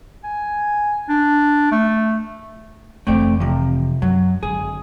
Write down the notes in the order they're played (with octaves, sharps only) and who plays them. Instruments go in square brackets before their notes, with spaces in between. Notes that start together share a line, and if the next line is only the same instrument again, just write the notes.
[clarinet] G#5
D4
A3
[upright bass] F1 E3 [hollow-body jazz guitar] A3 C4 D5
[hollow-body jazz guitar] C3 F3
[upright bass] F#2 [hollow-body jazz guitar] F#3
[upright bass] G#1 D3 [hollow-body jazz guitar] G#4